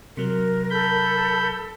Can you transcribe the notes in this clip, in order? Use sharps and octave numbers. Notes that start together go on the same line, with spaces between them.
C3 F#3 A#4
A4 B5 G6